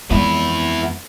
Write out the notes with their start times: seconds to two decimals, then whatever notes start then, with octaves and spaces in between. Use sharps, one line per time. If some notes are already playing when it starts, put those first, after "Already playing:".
0.11 F2 E3 G#3 B3 E4